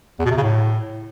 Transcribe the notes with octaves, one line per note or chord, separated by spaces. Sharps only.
E2
B2
C3
C#3
A2